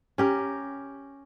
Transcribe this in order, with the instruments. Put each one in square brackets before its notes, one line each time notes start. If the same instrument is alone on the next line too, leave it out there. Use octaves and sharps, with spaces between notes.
[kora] C#4 G4 A#4